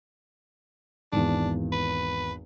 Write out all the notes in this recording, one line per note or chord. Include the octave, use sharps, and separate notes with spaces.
G#1 E2 D4
B4